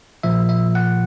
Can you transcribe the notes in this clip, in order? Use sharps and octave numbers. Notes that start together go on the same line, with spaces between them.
A#2 F3 E5
E5
F#5